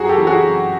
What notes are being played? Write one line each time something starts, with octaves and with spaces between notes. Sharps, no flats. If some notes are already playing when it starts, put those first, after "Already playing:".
Already playing: F#2 F#4 G#4
G4 A4
C#3 E3
F#4 G#4
F#2